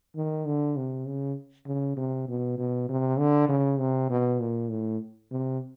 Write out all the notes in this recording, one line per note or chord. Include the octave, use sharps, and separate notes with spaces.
D#3
D3
C3
C#3
C#3
C3
B2
B2
C3
D3
C#3
C3
B2
A#2
A2
C3